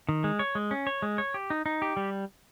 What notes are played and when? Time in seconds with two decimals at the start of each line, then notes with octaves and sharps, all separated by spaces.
0.09 D#3
0.24 G#3
0.39 C#5
0.55 G#3
0.71 C#4
0.87 C#5
1.02 G#3
1.18 C#5
1.34 G4
1.50 D#4
1.66 D#4
1.82 G4
1.97 G3